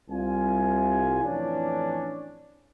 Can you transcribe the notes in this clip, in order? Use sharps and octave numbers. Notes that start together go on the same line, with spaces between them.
C2 F4 G#5
F2 A2 E3 C#4 D4